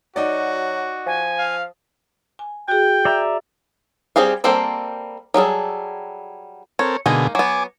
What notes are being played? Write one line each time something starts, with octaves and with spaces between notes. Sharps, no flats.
F#3 D#4 F#4 D5
F3 G#5
F5
G#5
F#4 G#4 G5
D5 E5 A#5
G3 C4 G4 G#4 F5
G3 A#3 C4 A4 C5
F#3 G3 G#4 A4
C4 A4 A#4 C#5
B2 D3 G#3 A#3 D#4 G#4
F#3 B3 G#5 D6